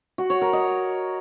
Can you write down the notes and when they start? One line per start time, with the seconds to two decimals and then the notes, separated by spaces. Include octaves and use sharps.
0.18 F#4
0.30 C#5
0.42 A#4
0.53 D#5